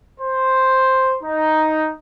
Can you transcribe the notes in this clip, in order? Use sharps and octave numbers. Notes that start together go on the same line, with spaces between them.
C5
D#4